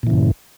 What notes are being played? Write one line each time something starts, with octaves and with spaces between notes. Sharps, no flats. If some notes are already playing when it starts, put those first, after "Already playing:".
G2 A#2 C#3 E3